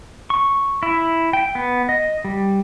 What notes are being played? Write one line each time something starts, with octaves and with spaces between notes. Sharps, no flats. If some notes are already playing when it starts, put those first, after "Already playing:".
C#6
E4
G5
B3
D#5
G3